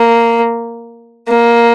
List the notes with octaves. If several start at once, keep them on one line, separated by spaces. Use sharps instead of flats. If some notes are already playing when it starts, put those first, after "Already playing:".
Already playing: A#3
A#3